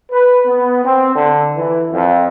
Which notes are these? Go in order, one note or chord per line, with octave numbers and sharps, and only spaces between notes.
B4
B3
C4
D3
E3
F2